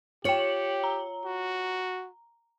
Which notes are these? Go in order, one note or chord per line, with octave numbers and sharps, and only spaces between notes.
F4 G4 C#5 G5 C#7 F#7
A#5
F#4